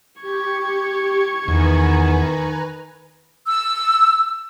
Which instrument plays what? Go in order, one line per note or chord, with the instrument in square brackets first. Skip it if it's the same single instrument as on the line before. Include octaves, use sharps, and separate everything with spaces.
[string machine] G4 [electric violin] C#6 G#6
[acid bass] E2 [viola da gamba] D#3 [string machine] B4 G#5 A#5
[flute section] E6